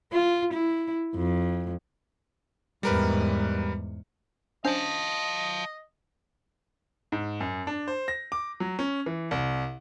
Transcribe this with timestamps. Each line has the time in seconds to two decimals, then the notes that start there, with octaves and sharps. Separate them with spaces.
0.12 F4
0.53 E4
1.15 F2
2.83 E2 G#2 G3 A#4 B4
4.65 C#4 D4 C5 D#5 F5 A5
7.12 G#2
7.40 F#2
7.67 D4
7.88 C5
8.08 A#6
8.32 D6
8.60 F#3
8.79 C#4
9.06 E3
9.31 C2